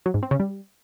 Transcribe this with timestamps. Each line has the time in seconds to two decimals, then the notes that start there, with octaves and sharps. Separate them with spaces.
0.06 F#3
0.14 G#2
0.23 C4
0.31 C#3
0.40 G3